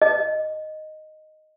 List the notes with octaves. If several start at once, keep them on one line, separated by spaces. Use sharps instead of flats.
D#5